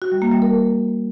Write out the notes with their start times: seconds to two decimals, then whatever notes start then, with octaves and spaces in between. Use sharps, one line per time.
0.02 F#4
0.12 G3
0.22 A#3
0.32 G3
0.42 A#4